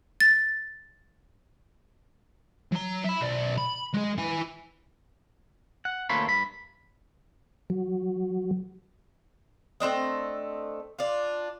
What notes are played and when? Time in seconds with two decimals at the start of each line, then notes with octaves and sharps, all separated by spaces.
0.20 A6
2.72 F#3 A#5
3.05 E5 B5
3.21 B1 D5
3.58 B5
3.94 G#3 G#4
4.18 E4 G#5
5.85 F#5
6.10 D2 A3 A#3 C#5 B5 C6
6.26 G2 B5
7.70 F#3
9.80 A3 C4 D4 D#5
10.99 D4 F4